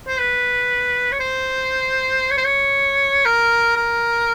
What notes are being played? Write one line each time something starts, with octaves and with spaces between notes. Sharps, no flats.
C5
B4
C#5
C5
C#5
C5
C#5
A#4
A#4